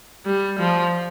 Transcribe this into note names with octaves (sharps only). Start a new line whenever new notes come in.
G3
F3